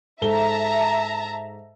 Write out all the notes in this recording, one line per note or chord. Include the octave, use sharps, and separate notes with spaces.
G#2 A4 E5 A5 A#5 G7